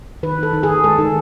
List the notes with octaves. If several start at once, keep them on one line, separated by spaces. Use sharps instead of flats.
D#3 B4
D#3 A4
D#3
G#4
D#3
G#3 A4
D#3